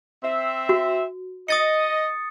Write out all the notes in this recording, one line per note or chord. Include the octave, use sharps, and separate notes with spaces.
C4 E5
F#4
D#5 D#6 A6 C#7